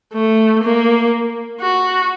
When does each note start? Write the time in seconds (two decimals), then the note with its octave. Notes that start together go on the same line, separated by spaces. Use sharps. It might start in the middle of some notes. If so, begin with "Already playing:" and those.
0.13 A3
0.63 A#3
1.61 F#4